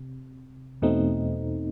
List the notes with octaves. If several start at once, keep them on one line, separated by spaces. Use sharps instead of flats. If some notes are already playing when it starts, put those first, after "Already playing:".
Already playing: C3
E2 B2 A3 C4 D#4